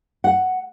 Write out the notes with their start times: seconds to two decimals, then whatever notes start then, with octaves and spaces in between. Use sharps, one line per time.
0.24 F#5